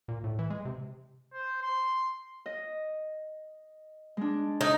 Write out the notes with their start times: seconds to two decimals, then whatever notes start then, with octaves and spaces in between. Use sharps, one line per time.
0.08 A#2
0.24 A2
0.39 E3
0.50 G#3
0.65 C3
1.33 C5
1.62 C6
2.46 D#5
4.17 G#3 D4
4.61 D#4